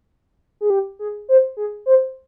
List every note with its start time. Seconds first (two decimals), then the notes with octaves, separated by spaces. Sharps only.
0.61 G#4
0.70 G4
0.99 G#4
1.29 C5
1.57 G#4
1.86 C5